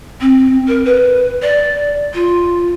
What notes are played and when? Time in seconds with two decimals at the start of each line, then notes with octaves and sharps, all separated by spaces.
0.20 C4
0.67 A#4
0.85 B4
1.42 D5
2.13 F4